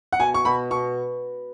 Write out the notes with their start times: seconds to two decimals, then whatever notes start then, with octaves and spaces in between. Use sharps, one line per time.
0.13 F#5
0.20 B2 G#5
0.34 C#6
0.45 B2 B5
0.71 B2 C#6